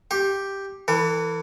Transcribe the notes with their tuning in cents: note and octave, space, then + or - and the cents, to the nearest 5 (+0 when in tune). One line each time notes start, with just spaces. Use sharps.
G4 +0 C6 +45
E3 +0 A4 +40